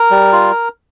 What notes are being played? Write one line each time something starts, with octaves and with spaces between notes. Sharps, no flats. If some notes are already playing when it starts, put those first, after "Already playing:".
Already playing: A#4
G3
F4